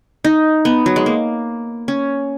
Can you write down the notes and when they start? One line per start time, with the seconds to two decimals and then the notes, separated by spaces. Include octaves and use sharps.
0.24 D#4
0.65 B3
0.86 F#3
0.96 G#3
1.06 A#3
1.88 C#4